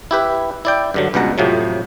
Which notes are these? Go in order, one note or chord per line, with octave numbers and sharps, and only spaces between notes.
E4 G4 B4
E4 D5 G5
G2 D3 F#3
C#2 G2 B2 F#5 A#5
F2 A2 C3 F3 F#3